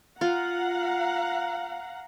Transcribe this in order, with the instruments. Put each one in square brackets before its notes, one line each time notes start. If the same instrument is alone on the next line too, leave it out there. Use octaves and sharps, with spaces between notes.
[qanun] F4 [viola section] F5 F#5 A#5